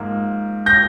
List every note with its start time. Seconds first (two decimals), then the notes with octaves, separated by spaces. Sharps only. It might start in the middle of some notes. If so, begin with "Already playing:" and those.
Already playing: G#2 F3 A#3
0.66 G6 A#6